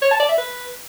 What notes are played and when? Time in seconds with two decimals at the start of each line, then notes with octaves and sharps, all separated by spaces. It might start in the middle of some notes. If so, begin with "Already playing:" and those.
0.02 C#5
0.11 A5
0.20 D5
0.29 E5
0.38 B4